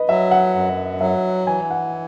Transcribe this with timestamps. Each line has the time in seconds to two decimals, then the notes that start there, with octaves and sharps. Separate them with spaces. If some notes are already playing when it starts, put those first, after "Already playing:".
Already playing: B4 D#5
0.09 F#3 E5
0.31 F#5
0.55 F#2
1.00 F#3 E5
1.47 E3 G#5
1.71 F#5